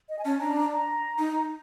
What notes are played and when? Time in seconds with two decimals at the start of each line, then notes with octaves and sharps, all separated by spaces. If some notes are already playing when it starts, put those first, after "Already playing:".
0.09 D#5
0.19 G#5
0.25 C#4 A5
0.36 A5
0.40 D4 A#5
0.56 A#5
0.72 A#5
1.18 D#4